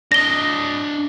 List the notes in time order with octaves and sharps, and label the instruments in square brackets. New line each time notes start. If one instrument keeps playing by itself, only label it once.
[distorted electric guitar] D4 D#5 [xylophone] A#6 G7